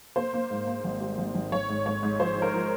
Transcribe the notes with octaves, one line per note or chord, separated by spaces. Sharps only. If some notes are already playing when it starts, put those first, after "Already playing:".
A#3 C5
A#3
G#2
A#3
G#1
G3
G#1
G#1
G#1 C#5
G#2
G#2 C#5
G#2
F3 C5
F3
A#4
F3